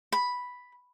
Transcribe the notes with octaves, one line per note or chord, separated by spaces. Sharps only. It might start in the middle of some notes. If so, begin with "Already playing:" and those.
B5